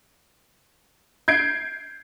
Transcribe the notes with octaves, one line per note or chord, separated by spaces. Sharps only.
G6 G#6 C7 D7